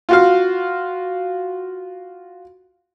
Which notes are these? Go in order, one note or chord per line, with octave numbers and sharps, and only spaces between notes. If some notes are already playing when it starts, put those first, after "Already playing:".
F4 F#4 F5